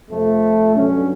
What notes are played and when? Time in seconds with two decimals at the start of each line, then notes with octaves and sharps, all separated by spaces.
0.11 F2 C3 F3 A3
0.75 G2 D3 F#3 C#4